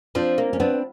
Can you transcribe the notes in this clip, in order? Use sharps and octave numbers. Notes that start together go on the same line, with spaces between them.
F3 C4 D4
A#3
C#4
B3 C4 D4